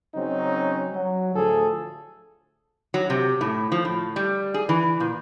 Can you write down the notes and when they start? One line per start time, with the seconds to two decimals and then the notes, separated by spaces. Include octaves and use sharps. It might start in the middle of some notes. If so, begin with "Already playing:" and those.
0.15 C#3 F#3 C4 C#4 D#4
0.92 F#3
1.34 D2 A2 F3 G#4 A4
2.94 F#3
3.10 C3
3.41 A2
3.72 F3
3.85 A2
4.16 G3
4.54 G#4
4.69 E3
5.00 A#2